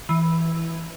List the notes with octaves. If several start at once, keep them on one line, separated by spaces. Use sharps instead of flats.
E3